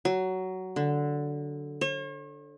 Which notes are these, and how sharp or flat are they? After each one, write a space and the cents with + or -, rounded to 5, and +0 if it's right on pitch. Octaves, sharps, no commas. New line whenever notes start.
F#3 +15
D3 +0
C#5 -45